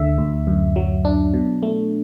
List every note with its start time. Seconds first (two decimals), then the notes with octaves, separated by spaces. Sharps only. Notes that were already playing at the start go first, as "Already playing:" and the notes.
Already playing: D2 D3 E5
0.18 D2
0.47 F#2
0.76 F#3
1.05 D4
1.34 B2
1.63 A3